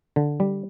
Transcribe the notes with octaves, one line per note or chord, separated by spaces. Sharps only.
D3
G3